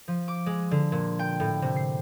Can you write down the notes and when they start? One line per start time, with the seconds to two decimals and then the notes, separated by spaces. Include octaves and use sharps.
0.08 F3
0.28 D6
0.46 G#3
0.71 D3
0.92 A#2
1.19 G5
1.40 A2
1.62 C3
1.76 C7